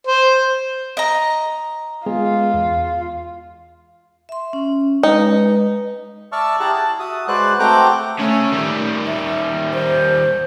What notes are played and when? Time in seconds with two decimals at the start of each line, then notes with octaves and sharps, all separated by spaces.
0.07 C5
0.97 D#5 A#5
2.06 G#3 B3 F4 G#4
2.54 E2
4.29 E5 C6
4.53 C#4
5.03 G#3 D#4 B4
6.32 D5 E5 A5 C#6 E6 F6
6.60 E4 G4 G#4 F#5 A5 A#5
6.73 A5
6.99 F#4 E5 D#6
7.28 G#3 F#4 B4 C5 D5 F#6
7.59 A3 C4 F#4 G5 A#5 D6
8.19 C#3 A3 C#4
8.52 D#3 G3
9.07 E5
9.73 C5